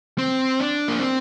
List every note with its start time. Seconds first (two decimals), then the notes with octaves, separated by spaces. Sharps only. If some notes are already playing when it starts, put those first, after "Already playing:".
0.18 C4
0.60 D4
0.88 A#3
1.00 C4